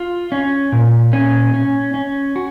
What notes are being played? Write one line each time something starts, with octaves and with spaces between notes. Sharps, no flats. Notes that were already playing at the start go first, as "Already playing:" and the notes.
Already playing: F4
C#4
A#2
C#4
C#4
C#4
F#4